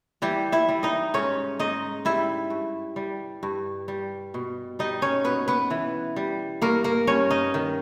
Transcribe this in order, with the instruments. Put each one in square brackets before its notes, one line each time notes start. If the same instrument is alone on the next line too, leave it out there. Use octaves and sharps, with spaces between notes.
[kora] E3 G3 G4
E4 E5
G3
D#4 D#5
G#2 C#4 C#5
G#2 D#4 D#5
G3 E4 E5
G2
G3
G2
G3
B2
G3 D#4 D#5
C#4 C#5
B2 B3 B4
B3 B4
E3
G3
G2 A#3 A#4
A#3 A#4
G2 C#4 C#5
D#4 D#5
D#3